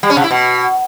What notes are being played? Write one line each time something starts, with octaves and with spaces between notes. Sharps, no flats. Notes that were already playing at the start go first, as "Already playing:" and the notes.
G3
C#4
C3
E4
B2